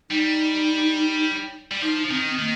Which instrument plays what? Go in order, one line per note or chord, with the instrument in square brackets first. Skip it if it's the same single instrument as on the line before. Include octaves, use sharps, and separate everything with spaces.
[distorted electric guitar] G3 [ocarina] D#4
[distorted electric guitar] G3
[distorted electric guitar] F3 [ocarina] D#4
[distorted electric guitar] D#3 [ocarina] C4
[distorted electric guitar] D#3 [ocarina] A#3